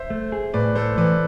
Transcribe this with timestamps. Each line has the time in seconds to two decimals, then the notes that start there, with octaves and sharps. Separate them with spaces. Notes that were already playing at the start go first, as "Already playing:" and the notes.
Already playing: C5 E5
0.10 A3
0.32 G#4
0.54 A2 B4 D5
0.75 A3 A4 C5
0.97 E3 B4 D5